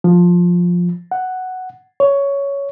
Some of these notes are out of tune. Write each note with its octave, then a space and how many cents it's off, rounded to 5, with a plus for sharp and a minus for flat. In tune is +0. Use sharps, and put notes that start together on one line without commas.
F3 +10
F#5 +5
C#5 +10